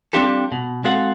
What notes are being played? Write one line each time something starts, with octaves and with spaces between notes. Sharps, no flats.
G3 C4 D4 F4 G4 A4
B2
G#3 C4 F#4 A4 F5 F#5